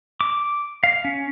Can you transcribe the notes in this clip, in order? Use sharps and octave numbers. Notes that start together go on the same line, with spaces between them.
D6
F5
C#4